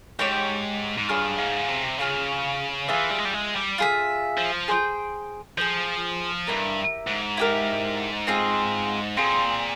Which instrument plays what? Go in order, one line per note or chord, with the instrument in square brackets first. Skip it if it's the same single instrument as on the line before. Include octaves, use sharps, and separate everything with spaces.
[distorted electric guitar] G#2 [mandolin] G4 C#5 G5
[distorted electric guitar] G#2
[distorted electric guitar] G2 [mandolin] F4 G#4 C#5 F5
[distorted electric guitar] G#2
C3
[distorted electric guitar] C#3 [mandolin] F4 G#4 C#5 F5
[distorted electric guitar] E3 [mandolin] F4 G#4 E5
[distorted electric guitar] G3
G#3
G3
G#3
G3
[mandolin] F4 G#4 E5
[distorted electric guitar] F3
[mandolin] G#4 C5 G5
[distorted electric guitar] F3 [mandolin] G#4 C5 G5
[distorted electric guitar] G2 [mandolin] E4 G4 A#4
[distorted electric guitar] G#2
[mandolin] E4 G4 A#4
C4 F4 G#4
[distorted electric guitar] A#2 [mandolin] C4 F4 G#4